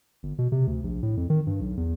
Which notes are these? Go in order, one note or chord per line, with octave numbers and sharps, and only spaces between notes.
G1
B2
C3
D2
A#1
A2
F2
D#3
G2
B1
E2